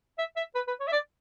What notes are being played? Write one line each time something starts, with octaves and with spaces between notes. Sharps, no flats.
E5
E5
B4
B4
C#5
E5
D5